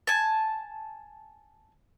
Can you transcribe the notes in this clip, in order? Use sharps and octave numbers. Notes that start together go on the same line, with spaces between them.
G#5 A5